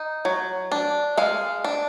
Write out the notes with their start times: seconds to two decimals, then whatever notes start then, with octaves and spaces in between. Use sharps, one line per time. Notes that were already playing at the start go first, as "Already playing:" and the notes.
Already playing: D#4
0.25 F#3
0.72 D4
1.18 G#3 F5
1.64 D4